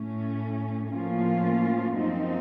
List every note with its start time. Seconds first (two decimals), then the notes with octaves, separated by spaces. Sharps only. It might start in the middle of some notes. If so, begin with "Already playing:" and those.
Already playing: A2 A3 C#4
0.92 A2 F3 A#3 C#4 F4
1.94 F#2 F3 C4 D#4